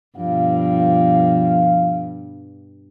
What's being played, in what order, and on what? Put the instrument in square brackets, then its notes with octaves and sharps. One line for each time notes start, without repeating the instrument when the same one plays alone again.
[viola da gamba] G2 B2 [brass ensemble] F3 F5